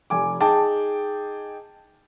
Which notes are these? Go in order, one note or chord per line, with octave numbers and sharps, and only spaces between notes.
F1 G#5 D6
D#4 G#4 G5 A5 D6